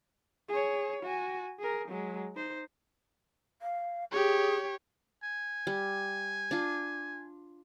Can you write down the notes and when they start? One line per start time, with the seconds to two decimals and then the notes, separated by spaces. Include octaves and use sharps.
0.49 G#4 C#5
1.03 F#4 G#5
1.59 G#4 A#4
1.88 F#3 G#3
2.35 D#4 C5
3.62 F5
4.12 G4 G#4 C#5
5.23 G#5
5.67 G3
6.51 D4 F4